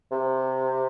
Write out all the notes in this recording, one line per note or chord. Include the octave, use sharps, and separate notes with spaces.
C3